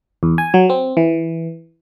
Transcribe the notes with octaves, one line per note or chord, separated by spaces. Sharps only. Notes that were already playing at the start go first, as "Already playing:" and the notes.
E2
G#5
F#3
C4
E3